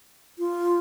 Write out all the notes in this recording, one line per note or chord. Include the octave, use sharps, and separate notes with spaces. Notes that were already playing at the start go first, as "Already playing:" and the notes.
F4